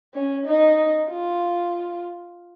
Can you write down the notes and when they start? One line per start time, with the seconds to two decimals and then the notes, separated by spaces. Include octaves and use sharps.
0.14 C#4
0.46 D#4
1.09 F4